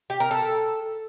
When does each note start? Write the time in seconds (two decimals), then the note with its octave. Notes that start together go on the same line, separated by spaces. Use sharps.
0.10 G4
0.20 A#4
0.31 A4